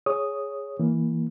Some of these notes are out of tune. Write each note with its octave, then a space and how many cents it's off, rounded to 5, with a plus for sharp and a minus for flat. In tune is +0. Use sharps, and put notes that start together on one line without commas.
G#4 +0 C#5 +0 D#6 +0
E3 +0 A#3 +0